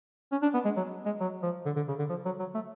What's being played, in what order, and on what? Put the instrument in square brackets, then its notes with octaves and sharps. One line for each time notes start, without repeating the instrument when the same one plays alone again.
[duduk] C#4
D4
B3
G#3
F#3
G#3
F#3
F3
D3
D3
C#3
D3
F3
F#3
F#3
A3